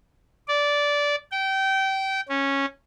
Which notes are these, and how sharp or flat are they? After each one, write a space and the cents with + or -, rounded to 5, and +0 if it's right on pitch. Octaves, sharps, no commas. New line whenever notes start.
D5 -15
G5 -25
C#4 -10